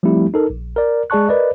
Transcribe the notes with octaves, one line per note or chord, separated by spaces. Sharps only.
F3 G3 A3 C4 E4 G4
D#4 A4 A#4
A#1
A#4 D5
G#3 G#4 D5 A5 C#6 F#6
A#4 B4 D5 D#5